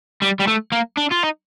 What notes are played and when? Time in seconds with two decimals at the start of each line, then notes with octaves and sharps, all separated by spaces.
0.22 G3
0.40 G3
0.48 A3
0.72 A#3
0.97 D4
1.11 F4
1.23 D#4